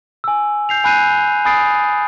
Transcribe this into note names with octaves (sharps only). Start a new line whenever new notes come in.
G#5 E6
G6 C7 F7
G#5 B5 F#6 G6 C7 D#7
G#5 B5 D#6 A6 C7 D7